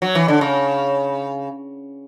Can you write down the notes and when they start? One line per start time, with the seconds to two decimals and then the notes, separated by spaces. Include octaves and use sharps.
0.02 F#3
0.15 E3
0.28 D3
0.41 C#3